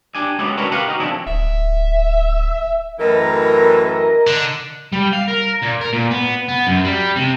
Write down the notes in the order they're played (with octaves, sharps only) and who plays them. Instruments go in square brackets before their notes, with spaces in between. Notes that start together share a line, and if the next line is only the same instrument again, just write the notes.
[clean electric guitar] D4 G4 G#5
G#3 B3 C#4 E4 F#4 G4
C#4 D4 E4 A#4 B4 C#5
F#4 G4 A#4 B4 F5 F#5
D#4 F#4 D#5
F3 C4 D4 E4 G#4
[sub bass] D1 [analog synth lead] E5
[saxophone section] F#2 A2 E3 [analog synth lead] A#4 [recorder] D#5
[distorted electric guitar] D3
G3
F5
A#4
A#2
A#4
A#2
B3
B3
F#2
G3
C3